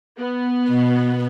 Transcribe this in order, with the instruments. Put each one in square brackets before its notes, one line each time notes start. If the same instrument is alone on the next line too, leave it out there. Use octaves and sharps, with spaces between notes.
[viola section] B3
[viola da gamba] B2